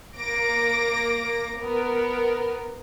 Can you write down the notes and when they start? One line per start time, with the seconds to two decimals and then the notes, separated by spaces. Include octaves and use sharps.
0.17 A#3 D6 A#6 D7
1.58 B3 A#4